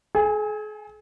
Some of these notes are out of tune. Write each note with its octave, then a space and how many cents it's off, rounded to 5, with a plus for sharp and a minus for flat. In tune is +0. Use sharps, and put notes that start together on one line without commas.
G#4 +45 G#5 -20